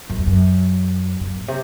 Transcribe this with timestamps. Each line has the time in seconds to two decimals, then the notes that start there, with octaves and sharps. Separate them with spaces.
0.10 F#2
0.18 F2
0.27 F#2
1.20 F#2
1.34 A2
1.48 C3